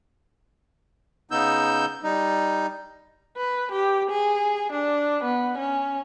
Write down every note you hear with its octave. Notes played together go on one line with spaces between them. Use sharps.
C#3 B3 D#4 E6 G6
G3 D#4
B4
G4
G#4
D4
B3
C#4